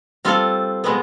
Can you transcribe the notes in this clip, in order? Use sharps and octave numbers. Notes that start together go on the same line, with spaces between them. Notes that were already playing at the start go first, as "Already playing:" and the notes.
G3 C4 F4 A4
B2 G#3 B3